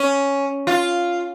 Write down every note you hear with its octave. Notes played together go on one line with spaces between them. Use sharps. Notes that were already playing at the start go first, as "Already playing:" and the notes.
Already playing: C#4
F4